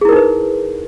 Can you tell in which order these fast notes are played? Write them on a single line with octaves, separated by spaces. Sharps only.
G#4 E4 A#4 D#4 B4